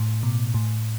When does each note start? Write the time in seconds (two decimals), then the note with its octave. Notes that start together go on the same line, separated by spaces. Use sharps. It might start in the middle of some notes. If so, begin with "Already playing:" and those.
Already playing: A2
0.23 B2
0.54 A2